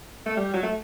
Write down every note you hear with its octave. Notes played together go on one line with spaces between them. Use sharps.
A3
G3
F#3
A3